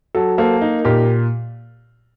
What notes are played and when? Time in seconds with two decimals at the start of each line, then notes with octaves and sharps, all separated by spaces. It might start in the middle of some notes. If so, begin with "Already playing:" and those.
0.15 F#3 A4
0.38 A#3 A4 C5
0.61 D#4
0.85 A#2 G4 A#4